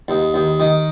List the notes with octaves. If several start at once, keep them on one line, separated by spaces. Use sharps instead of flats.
D#2
D#2
D#3